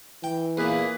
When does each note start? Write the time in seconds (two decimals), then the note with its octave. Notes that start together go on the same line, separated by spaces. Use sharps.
0.24 E3 G5
0.57 E2 A#2 A#3 G#4 B4